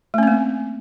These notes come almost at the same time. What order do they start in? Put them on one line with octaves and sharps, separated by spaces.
A3 C#4 C4 A#3